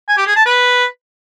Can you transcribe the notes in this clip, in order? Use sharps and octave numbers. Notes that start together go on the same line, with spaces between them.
G#5
G4
G#4
A5
B4